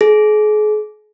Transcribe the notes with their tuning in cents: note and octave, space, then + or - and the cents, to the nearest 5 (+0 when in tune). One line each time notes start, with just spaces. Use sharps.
G#4 +35